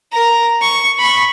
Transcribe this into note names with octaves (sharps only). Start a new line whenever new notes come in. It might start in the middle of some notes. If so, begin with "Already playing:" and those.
A#4 A#5
C#6
B5 C#6